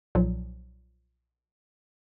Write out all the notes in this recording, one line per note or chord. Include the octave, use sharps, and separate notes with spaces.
B1 A#2 F3 F#3